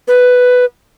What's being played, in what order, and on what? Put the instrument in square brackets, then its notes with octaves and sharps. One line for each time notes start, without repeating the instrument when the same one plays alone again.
[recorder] B4